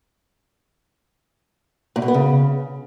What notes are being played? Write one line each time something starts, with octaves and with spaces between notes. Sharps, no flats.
A#2
B2
B3
C#3